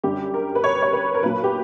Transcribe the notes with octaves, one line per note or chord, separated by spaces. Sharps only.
F#2 D3 G3 G4
A#4
B4
C#5
C#5
B4
A#4
B1 A#2 F#3 B4
G4